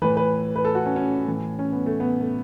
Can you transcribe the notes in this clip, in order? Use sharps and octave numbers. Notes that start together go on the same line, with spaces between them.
A2 E3 B4
B4
B4
A4
F#4
C#4
C#4
A2 E3
C#4
B3
A3
B3
A3